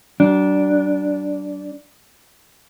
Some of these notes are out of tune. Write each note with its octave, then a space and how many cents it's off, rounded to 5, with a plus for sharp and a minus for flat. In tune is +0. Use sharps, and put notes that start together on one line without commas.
F#3 +45 D4 -10